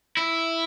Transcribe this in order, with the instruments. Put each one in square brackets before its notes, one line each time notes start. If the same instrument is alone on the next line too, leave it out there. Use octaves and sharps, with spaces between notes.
[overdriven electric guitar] E4